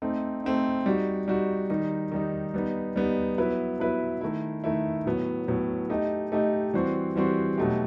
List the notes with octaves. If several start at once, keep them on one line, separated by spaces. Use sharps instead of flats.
A3 C4 D#4
A3 C4 D#4
G3 D#4 F#4
G3 D#4 F#4
D#3 G3 D#4
D#3 G3 D#4
G3 B3 D#4
G3 B3 D#4
F#3 B3 E4 B4
F#3 B3 E4 B4
D#3 A3 E4
D#3 A3 E4
A2 F#3 B3
A2 F#3 B3
A3 D#4 G4 D#5
A3 D#4 G4 D#5
E3 G3 C4 F#4 C5
E3 G3 C4 F#4 C5
B2 F#3 A3 D#4 G4